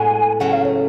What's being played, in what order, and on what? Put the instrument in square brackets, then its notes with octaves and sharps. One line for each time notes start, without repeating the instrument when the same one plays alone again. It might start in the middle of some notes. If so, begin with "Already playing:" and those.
Already playing: [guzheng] A2 G#3 B3 F#4 [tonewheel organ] G#5
[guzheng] C#3 F#3 A3 [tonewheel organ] F#5
[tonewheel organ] F5
C#5